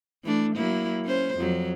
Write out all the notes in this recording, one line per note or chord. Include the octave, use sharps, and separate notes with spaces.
E3 A3 D4
F#3 A#3 E4
C#4 C5
F2 F#3